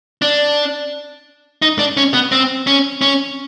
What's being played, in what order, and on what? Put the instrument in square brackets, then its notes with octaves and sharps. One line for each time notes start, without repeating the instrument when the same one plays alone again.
[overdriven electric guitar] D4
D#4
D4
C#4
B3
C4
C#4
C#4